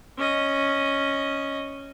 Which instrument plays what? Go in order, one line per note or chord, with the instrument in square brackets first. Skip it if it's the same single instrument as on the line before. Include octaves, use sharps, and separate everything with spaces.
[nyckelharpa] C#4 D#5